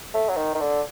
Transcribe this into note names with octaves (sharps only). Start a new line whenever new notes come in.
A3
F#3
D#3
D#3
D3